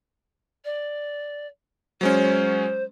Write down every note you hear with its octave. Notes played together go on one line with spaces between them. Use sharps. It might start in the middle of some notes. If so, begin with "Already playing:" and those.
D5
F#3 G#3 C#4 C5